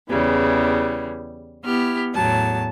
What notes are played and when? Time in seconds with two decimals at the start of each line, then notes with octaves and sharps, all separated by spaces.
0.10 E2 C#3 E3 G3
1.63 B3 E4 G4 F6
2.14 E2 A2 F#3 A5